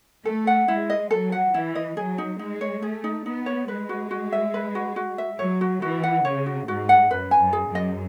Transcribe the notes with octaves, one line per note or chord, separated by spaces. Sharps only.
A3 A4
F#5
G#3 E4
D#5
F#3 A4
F#5
E3 E4
D#5
F#3 G#4
D#4
G#3 D#4
C#5
A3 G#4
D#4
B3 D#4
C#5
G#3 B4
F#4
F#4
E5
B4
F#4
F#4
E5
F#3 C#5
F#4
E3 F#4
F#5
C#3 C#5
F#4
G#2 F#4
F#5
F#2 B4
G#5
F#2
G#4
F#2
D#5